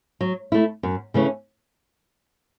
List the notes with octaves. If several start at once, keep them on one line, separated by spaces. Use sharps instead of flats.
F#3
A3 E4
F#2
C#3 E3 A3 C#4